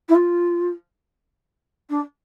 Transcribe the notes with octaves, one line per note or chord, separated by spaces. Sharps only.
E4
F4
D4